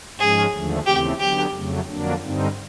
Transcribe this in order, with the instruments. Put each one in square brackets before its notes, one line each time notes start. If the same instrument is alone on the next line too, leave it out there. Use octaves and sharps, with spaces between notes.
[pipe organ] G#2 F3 G#3 C#4 [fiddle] G#4
[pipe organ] D#2 D3 F3 A3
[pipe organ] D#2 C#3 E3 A3 C4 [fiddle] G4
[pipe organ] D3 F#3 B3 [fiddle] G4
[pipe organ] F2 C#3 F#3 A3
F2 D3 F#3 A#3 D4
G2 D3 G3 C4 D#4